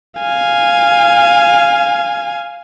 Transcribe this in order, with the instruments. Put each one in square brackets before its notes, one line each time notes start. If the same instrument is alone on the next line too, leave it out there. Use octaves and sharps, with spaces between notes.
[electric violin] F5 G#5